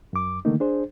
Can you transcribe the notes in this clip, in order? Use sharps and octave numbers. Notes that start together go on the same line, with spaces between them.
F#2 D6
D3 D#3 A3 A#3 D#4
D4 G#4 C5